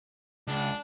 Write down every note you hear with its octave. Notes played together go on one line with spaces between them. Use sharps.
C#2 D4